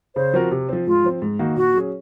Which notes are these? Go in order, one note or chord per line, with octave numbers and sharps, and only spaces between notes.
C#3 C5
F3 C4 F#4 A#4
C3
F3 C4
G#2 F4
F3 C4
G#2
D#3 A#3 D#4 F#4
A#2 F#4
F#3 C#4 G#4